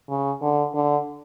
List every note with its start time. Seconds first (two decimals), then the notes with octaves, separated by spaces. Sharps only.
0.09 C#3
0.42 D3
0.74 D3